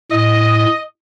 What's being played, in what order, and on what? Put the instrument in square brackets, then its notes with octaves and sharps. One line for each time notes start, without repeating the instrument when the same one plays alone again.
[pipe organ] A2 [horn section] D#5